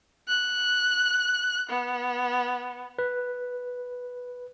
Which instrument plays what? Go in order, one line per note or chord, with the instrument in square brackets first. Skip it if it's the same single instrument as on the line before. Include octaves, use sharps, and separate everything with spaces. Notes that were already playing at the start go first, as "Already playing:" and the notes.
[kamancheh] F#6
B3
[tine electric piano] B4